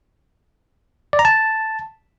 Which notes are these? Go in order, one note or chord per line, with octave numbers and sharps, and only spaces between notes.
D5
A#5
A5